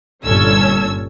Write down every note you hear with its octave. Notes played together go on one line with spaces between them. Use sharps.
G1 A#2 C#4 A4 E6 G#6